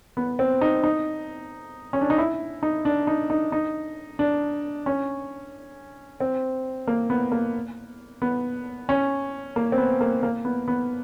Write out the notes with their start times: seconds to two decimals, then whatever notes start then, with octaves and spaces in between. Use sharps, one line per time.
0.17 B3
0.39 C4
0.61 D#4
0.84 D#4
1.93 C#4
2.01 D4
2.10 D#4
2.18 E4
2.63 D#4
2.85 D4
3.07 D#4
3.30 D#4
3.52 D#4
4.19 D4
4.86 C#4
6.20 C4
6.87 A#3
7.10 B3
7.32 A#3
8.22 B3
8.89 C#4
9.56 A#3
9.72 C4
9.78 B3
10.01 A#3
10.23 A#3
10.45 B3
10.68 B3